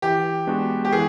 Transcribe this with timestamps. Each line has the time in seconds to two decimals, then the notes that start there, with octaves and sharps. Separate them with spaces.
0.02 E3 G4
0.47 G#3 B3 D4 F#4
0.85 G4
0.92 E3 G#4